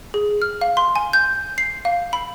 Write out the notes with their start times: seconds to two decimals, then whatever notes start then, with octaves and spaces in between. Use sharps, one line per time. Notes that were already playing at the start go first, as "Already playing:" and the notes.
0.14 G#4
0.42 F6
0.61 F5
0.77 C6
0.96 G#5
1.13 G6
1.58 C7
1.85 F5
2.13 B5